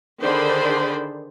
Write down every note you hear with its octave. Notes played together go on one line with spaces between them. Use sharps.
D3 D#3 G#4 C5 D5 B5